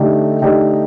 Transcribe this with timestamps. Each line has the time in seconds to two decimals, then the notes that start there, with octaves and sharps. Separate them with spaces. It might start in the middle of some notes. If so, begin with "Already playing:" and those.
Already playing: D3 A3 D#4 G4
0.42 D3 A3 D#4 G4